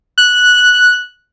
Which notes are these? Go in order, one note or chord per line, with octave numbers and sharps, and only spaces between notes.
F#6